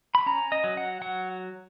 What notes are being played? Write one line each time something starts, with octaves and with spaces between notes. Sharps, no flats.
B5
C#4 A#5
D#5
F#3
F#5
F#3 F#5